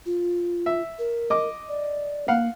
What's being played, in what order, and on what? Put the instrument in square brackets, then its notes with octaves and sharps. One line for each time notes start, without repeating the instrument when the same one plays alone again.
[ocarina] F4
[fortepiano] E5
[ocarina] A#4
[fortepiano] D#5 D6
[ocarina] D5
[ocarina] A#3 [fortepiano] F5 F#5